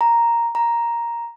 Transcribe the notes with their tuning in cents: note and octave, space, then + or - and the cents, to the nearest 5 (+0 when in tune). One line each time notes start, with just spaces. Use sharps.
A#5 +0
A#5 +5